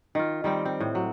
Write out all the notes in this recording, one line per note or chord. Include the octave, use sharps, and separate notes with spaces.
D#3 F4
D#3 G3 C4
C4
A2
F#3